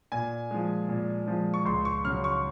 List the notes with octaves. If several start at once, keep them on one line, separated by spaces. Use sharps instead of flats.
A#2 G#5
F3 G#3
A#2
F3 G#3
C#6
C#2 C6
C#6
C#3 F#3 F6
C#6